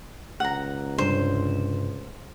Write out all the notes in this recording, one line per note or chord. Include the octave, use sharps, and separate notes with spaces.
C#2 F#5 A#5
G2 C3 D4 C5